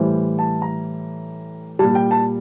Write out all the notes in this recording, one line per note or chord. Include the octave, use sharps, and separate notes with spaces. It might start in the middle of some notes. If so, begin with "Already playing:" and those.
Already playing: A2 E3 G3 C5
A5
A#5
A#2 G3 A5
G5
A5